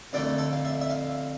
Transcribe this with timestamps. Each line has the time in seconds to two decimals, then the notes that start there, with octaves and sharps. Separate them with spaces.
0.13 F2 D3 A3 D5
0.38 A4
0.53 F5
0.65 E5
0.81 E5
0.90 F5